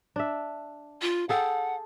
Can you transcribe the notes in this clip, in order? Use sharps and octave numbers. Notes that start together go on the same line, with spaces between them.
D4 E5
F4
G#4 A4 F#5 G5